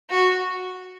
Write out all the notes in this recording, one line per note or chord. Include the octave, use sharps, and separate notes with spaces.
F#4